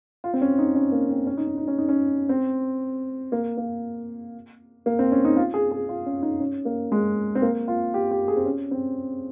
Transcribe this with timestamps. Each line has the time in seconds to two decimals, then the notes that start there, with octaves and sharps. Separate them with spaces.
0.24 F4
0.34 C4
0.41 C#4
0.59 D#4
0.75 C#4
0.92 A#3
1.09 C4
1.27 C#4
1.37 D#4
1.47 C#4
1.57 D#4
1.68 C#4
1.78 D#4
1.89 C#4
2.29 C4
3.32 A#3
3.57 A#3
4.86 A#3
4.99 C4
5.12 C#4
5.25 D#4
5.37 F4
5.54 G#4
5.71 G#4
5.89 F4
6.06 C#4
6.23 D#4
6.40 C#4
6.65 A#3
6.92 G#3
7.35 C4
7.42 A#3
7.68 F4
7.94 G4
8.11 G4
8.28 G#4
8.37 C4
8.46 C#4
8.71 C4